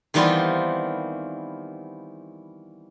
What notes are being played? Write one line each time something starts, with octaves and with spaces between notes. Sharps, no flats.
D#3 E3 G3 B3 C4 F4